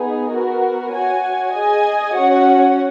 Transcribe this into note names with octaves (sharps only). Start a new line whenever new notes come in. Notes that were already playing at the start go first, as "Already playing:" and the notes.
Already playing: B3 D#4 G#4
B3 F#4 A#4
F#4 C#5 G#5
G#4 D#5 G#5
C#4 F#4 C#5 F#5